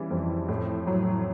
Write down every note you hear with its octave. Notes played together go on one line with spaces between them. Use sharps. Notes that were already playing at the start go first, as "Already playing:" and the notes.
Already playing: C#3 E3 G3
F2
A2
F#3